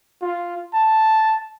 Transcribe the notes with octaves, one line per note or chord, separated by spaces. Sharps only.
F4
A5